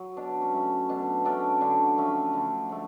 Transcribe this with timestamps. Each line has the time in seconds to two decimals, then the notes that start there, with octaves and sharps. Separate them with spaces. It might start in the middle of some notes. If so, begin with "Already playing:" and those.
Already playing: F#3
0.17 B2 D4
0.41 C#4
0.53 F#3 A3 C#4
0.89 B2 D4
1.25 F#3 A3 C#4 D4
1.61 D3 D4
1.98 F3 A3 C#4
2.33 D3
2.69 F3 A3